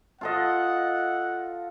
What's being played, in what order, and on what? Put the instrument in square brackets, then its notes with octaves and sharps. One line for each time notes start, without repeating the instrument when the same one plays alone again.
[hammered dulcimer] F4 A4 D#5 [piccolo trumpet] F#5